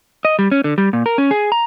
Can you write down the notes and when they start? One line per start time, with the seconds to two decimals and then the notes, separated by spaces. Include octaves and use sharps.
0.25 D#5
0.39 G3
0.52 C#4
0.64 D3
0.78 G3
0.93 A#2
1.06 A#4
1.18 C#4
1.31 G#4
1.52 A#5